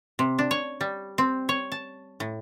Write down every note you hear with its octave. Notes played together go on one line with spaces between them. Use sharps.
C3
D4
C#5
G3
C4
C#5
A5
A2